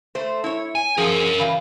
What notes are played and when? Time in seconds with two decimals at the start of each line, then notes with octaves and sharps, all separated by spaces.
0.15 A3 C5
0.44 E4 C#5
0.75 G#5
0.97 F3 F#4 G#4 A#4 G#5
1.38 C#3 E3 F5